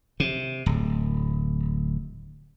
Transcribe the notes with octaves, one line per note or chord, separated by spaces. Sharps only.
C3
D1